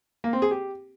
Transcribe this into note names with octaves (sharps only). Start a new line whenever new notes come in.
A#3
C4
G#4
G4